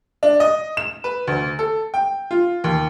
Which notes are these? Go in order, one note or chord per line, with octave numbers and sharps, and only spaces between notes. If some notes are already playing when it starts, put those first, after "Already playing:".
D4
D#5
E7
B4
D2
A4
G5
F4
D#2